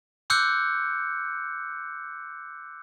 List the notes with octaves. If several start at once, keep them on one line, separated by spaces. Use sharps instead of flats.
C6 D6 E6 F#6 G6 C#7